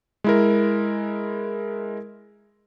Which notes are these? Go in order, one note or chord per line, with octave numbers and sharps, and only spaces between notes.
G#3 E4 A#4